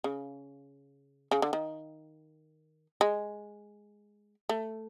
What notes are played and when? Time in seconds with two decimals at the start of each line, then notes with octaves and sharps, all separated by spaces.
0.04 C#3
1.31 C#3
1.42 D3
1.53 D#3
3.01 G#3
4.49 A3